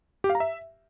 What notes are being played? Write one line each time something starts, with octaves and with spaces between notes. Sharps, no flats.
G4
F5
A#5
E5